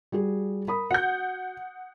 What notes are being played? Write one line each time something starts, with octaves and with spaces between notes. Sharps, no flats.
G3 F#4 G#4
A#4 B5 D#6
F#4 F#5 G6